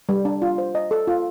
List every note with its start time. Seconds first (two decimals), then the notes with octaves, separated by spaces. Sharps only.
0.09 G3
0.25 D4
0.42 F4
0.58 C5
0.75 D#5
0.91 A4
1.07 F4